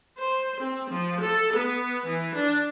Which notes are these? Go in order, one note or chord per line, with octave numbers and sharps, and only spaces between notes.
C5
C4
F3
A4
B3
E3
D4